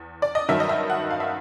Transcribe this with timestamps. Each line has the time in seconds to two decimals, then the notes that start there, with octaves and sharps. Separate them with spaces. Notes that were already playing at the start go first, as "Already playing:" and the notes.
Already playing: E2
0.22 D5
0.35 D#5
0.49 G2 D#3 F#3 E5
0.60 D#5
0.69 E5
0.90 F#5
1.11 F5
1.20 E5